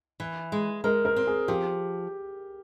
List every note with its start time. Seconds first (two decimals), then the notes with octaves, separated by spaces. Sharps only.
0.20 E3
0.52 G#3
0.84 G#3 A#4
1.05 A#4
1.16 C4
1.27 G#4
1.48 F3 G4